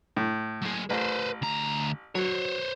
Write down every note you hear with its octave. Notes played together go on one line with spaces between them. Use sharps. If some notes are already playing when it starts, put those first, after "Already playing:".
A2
F#3 G#4
A1 B4 C5
D2 A#5
F#3 C5 C#5